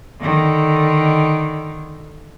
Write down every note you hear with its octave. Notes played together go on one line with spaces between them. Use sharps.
D3 D#3